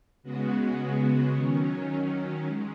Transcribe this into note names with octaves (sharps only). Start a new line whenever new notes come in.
C#3 G#3 B3 F#4
D#3 F#3 C#4
G#3